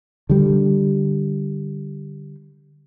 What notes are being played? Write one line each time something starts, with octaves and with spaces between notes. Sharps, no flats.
D3 G3